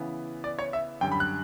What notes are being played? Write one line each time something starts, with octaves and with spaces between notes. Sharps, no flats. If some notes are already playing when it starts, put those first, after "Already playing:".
Already playing: C#3 E3 B3
D5
C#5
E5
F#2 D3 G3 G5
B5
F#6